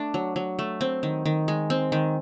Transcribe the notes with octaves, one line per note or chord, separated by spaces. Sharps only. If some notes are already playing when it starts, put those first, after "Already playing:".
Already playing: A3 D4
F#3
F#3
A3
C4
D#3
D#3
G#3
C4
D#3